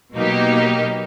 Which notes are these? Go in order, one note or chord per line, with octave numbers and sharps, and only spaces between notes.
B2 F#3 A#3 D#4 G4